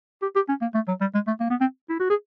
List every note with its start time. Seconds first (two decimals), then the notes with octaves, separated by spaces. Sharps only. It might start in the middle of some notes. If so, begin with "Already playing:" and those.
0.22 G4
0.36 G4
0.49 C#4
0.62 A#3
0.75 A3
0.88 F#3
1.01 G3
1.15 G#3
1.27 A3
1.40 A#3
1.50 B3
1.61 C4
1.90 E4
2.00 F#4
2.10 G#4